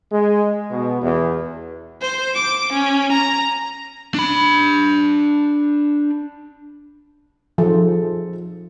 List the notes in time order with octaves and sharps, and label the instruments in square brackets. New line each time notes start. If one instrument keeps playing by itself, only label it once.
[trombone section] G#3
B2
E2
[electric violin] C5
D6
C#4
A#5
[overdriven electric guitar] D4 B5
[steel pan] F3 [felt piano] D#4 G#4 A4